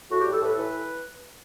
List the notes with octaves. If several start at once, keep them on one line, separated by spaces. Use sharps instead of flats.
A2 F#4
G4
G3
A4
A2 B4
A4
E3 B4